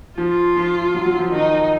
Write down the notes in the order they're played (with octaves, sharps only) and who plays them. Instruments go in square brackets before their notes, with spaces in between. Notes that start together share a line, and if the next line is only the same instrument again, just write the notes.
[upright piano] F3 [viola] F4
[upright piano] F3
F#3
F#3
F3
[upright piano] D#3 [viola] D#4